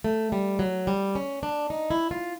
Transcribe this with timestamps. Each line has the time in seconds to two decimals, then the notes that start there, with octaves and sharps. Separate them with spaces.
0.04 A3
0.32 G3
0.59 F#3
0.87 G3
1.15 C#4
1.43 D4
1.70 D#4
1.90 E4
2.11 F4